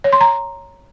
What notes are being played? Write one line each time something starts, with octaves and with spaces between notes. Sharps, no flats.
C#5
C6
A#5